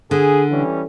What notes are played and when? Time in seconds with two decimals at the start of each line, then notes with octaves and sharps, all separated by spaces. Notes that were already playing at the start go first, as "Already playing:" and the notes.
0.11 D3 G#4
0.51 E3 G3 C#4